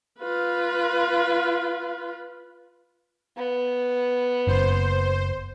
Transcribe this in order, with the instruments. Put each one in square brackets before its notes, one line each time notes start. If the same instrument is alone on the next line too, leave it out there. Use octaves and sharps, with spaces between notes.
[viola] F4 B4
[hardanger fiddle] B3
[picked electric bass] F#1 [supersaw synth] C5